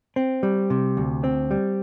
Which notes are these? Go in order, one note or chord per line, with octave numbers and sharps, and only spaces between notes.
C4
G3
C3
D2
C4
G3